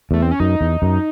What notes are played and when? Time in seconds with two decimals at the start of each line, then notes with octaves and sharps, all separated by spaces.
0.11 E2 A3
0.22 C4
0.31 C#4
0.40 F#2 D#4
0.61 E2
0.82 F#2